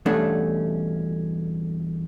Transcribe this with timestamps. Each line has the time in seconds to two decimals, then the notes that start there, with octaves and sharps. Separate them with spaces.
0.06 E2 G2 B2 A3 C#4 D4